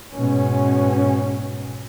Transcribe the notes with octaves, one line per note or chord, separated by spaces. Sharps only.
G#2 B2 C#4